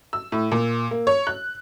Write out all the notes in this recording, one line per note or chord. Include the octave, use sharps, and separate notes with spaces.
E6
A2
A#2
A#3
C#5
F#6